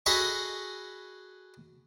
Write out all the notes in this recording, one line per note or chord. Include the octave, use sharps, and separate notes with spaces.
F#4 G#4 A4 D#5 B5 C#6